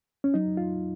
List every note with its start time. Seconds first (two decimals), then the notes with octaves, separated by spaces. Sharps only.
0.24 C#4
0.34 F#3 D#4
0.57 F4